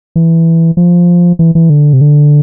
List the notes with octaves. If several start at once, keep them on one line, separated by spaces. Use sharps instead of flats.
E3
F3
E3
E3
D3
C3
D3